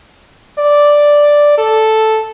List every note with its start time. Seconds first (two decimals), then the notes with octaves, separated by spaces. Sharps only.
0.58 D5
1.58 A4